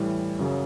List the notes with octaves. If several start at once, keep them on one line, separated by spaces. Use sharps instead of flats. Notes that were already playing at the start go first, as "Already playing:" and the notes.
Already playing: A2 E3 G3
F#2 C#3 F#3